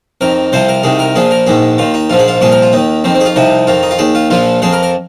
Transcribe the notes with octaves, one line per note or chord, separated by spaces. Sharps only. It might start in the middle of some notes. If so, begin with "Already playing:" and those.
F2 D#3 A#4
C2 C3 F3 C5
A#4
C2 C3 D#3 G#4
A#4
A#1 A#2 F3 G#4
A#4
A#1 G#2 D#3 G#4
D#2 D#3 F4
D#4
A#1 G#2 F3 F4
G#4
F4
C2 A#2 F3 G#4
A#4
F4
D#2 D#3 D#4
F2 D#3 C4
C4
G#4
F4
C2 C3 F3 D#4
F2 D#3 F4
D#4
F4
D#2 D#3 G#4
F4
A#1 A#2 F3 F4
F2 F3 G#4
A#4
A#4